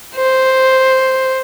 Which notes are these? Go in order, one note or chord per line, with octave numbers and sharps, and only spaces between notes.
C5